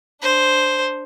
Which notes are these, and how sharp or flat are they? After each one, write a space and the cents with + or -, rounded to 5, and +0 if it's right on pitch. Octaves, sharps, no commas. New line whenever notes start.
D4 +0 C5 +0